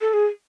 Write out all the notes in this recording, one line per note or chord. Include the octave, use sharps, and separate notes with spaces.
A4
G#4